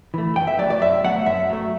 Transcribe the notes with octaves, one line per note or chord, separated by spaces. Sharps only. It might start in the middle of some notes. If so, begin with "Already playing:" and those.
E3 A3
F#2 G5
E5
F#3 A3 D5
D5
F#2 E5
F#3 A3 F#5
F#2 E5
F#3 A3